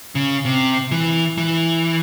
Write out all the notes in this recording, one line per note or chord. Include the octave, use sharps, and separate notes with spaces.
C#3
C3
E3
E3